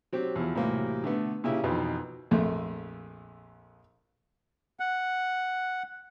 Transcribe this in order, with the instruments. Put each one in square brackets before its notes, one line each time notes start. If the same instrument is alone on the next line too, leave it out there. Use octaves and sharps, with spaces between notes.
[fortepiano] F#3 C4 G4
E2 F3
A2 C3 E3 F#3 G3 A#3
D3 A3 B3
A#2 C#3 E4 G4
F2 B2 D#3 E3
A#1 F2 A3
[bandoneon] F#5